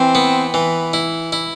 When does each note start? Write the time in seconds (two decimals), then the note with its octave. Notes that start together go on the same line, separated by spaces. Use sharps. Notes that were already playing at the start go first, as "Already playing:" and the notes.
Already playing: E3 C4
0.15 B3
0.54 E3
0.93 E4
1.32 E4